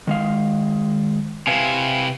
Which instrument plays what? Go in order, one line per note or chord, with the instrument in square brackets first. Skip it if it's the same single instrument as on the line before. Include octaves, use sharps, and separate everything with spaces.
[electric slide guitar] D#3 G#3 F5
[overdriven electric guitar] C3 E4 [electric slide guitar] B4 F5 G#5